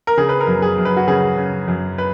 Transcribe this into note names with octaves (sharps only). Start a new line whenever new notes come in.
A#4
C#3 G#4
B4
A#4
F#2
G#4
F#2
B4
F#4
C#3 G#4
C#3
F#2
B4